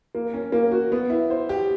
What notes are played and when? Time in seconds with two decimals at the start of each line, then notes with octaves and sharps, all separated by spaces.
0.15 A#3
0.34 C#4
0.52 A#3
0.72 F#4
0.92 B3
1.10 E4
1.30 C5
1.49 G4